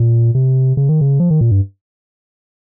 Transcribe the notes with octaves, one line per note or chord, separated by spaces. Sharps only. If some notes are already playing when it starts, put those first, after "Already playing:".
Already playing: A#2
C3
C#3
D#3
C#3
F3
D#3
A#2
G2